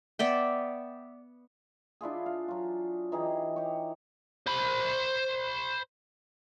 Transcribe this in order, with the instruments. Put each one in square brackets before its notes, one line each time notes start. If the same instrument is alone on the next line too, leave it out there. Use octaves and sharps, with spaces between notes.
[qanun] B3 D5 E5 G5
[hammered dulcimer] D4 E4 F4 G#4
F5
F#3 F4
E3 D#4 G4 G#4
G4 C#5
[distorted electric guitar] C5 B5